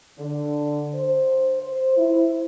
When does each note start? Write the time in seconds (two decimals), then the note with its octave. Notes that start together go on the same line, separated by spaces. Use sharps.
0.18 D3
0.95 C5
1.60 C5
1.97 E4